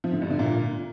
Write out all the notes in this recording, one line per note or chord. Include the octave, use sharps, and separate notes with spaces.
F3
D3
G2
D3
A#2